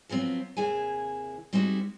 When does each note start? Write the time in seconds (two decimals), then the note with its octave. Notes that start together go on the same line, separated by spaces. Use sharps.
0.09 F3 F#3 B3 C4
0.57 D#2 C3 E4 G#4 G#5
1.53 G3 G#3 C4 D#4 E4 F#4